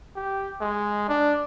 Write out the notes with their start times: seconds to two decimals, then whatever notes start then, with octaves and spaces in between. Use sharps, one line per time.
0.16 G4
0.61 G#3
1.09 D4